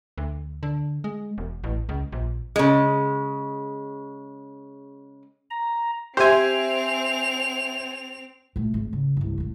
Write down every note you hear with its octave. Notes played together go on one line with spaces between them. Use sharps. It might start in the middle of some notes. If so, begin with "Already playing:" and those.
D2
D3
G#3
E1
A1
C#2
A#1
C#3 G#3
A#5
C4 G4 C5 E5 G#5 C6 F7
A#2 A3
G#1
C#3
G1 C2
A1 F2